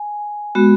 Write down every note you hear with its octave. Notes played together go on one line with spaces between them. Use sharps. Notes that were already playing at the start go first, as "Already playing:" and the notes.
Already playing: G#5
G#3 B3 F#4